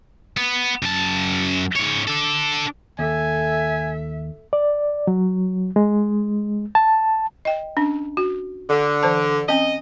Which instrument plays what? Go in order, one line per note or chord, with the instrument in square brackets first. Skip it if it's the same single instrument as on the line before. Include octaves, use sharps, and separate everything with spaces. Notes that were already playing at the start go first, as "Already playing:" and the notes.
[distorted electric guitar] B3
F#2 A5
G#2 C#5
D4 A4
[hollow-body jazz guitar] D#2 [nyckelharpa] A4 [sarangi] E5 [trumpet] G#5
[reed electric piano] D5
F#3
G#3
A5
[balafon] D#5 G5
C#4 D4
F#4
[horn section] D3
[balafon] E3 C5 A5
[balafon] C4 C#4 [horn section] D#5